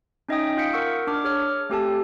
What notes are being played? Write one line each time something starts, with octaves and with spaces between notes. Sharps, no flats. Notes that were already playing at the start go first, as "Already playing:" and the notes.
C#4 D#4 D#5 E5 G5 D#6
F4 F5 G6 B6 C#7 D7
A#4 F#5 C#6 E6
D4 D6 F6
G#4 C#5 F6
A3 C4 G4 A4 G#5 A5